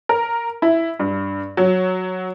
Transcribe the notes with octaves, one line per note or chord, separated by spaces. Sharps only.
A#4
E4
G2
F#3